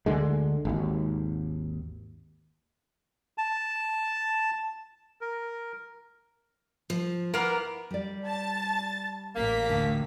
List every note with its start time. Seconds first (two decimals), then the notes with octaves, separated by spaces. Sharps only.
0.06 D2 D3 G#3
0.65 G#1 D#2
3.38 A5
5.21 A#4
6.90 F3
7.34 A#3 B3 E4 A#4
7.91 G3 D5
8.26 A5 A6
9.36 A1 A#3 B6
9.69 D2 A2 D3